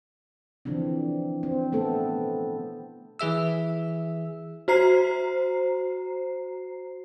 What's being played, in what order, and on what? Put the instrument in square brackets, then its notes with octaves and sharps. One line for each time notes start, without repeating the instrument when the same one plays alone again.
[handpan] D3 E3 F3 C4 D4
C4
A3 B3 A4
[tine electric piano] E3 G#4 E5 E6
[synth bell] F#4 C5 A#5 C7